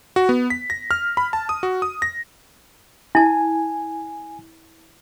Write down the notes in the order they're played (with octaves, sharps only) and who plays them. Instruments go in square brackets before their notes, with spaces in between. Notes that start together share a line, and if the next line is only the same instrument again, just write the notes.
[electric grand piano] F#4
B3
B6
A#6
F6
B5
A5
D#6
F#4
D#6
A#6
[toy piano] E4 A5 [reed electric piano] G#5